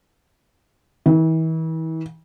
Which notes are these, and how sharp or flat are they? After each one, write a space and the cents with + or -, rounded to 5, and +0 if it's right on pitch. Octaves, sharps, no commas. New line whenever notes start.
E3 -40